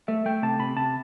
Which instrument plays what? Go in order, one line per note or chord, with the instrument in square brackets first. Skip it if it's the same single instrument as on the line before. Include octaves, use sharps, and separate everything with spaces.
[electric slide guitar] A3 [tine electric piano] E5
[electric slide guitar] A3 [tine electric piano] G5
[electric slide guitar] C3 [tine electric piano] A5
[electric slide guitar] C3 [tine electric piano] B5
[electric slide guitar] C3 [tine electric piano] A5